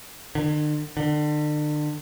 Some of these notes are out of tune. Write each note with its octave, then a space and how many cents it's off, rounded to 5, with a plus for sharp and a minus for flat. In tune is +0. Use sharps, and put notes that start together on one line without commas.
D3 +45
D3 +35